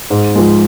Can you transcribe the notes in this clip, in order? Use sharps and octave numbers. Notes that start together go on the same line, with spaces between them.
G#2
F3 G#3